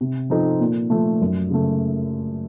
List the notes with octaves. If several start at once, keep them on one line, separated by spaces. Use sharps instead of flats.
C3
F3 C4 D#4 A4
A#2
F3 A3
F#2
C#3 A3